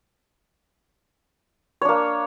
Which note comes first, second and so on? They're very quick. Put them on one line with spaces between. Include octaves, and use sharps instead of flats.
C#5 D4 A#3